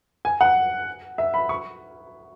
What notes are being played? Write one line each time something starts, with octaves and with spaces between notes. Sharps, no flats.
G#5
F#5
E5
B5
C#6